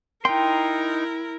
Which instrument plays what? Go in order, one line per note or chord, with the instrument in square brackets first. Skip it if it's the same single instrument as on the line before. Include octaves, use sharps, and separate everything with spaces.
[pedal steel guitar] D#4 C6 [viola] E4 A#4 [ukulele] G5